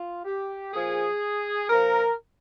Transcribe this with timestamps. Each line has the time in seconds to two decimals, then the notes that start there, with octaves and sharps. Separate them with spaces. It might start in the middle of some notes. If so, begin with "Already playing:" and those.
Already playing: F4
0.25 G4
0.73 A#2 F3 G#4
1.70 A#2 F3 A#4